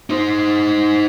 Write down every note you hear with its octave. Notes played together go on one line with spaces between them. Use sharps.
D#4 C5